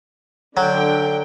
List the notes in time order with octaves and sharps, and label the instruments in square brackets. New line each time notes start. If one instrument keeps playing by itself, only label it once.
[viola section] D3 G5 [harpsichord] F#3